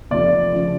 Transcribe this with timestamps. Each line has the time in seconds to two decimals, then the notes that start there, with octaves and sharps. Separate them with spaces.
0.11 F1 F2 F3 D5
0.54 C#3 F3